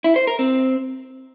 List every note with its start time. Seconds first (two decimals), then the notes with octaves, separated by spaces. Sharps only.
0.04 E4
0.16 C5
0.27 A#4
0.39 C4